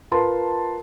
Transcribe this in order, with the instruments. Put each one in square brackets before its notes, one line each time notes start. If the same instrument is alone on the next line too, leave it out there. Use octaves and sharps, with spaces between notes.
[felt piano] F4 A#4 B4 A5 C6